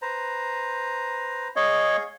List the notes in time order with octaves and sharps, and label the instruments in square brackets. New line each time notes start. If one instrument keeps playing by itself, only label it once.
[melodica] B4 C5 A#5
[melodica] G#4 F5 [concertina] C#5 D#5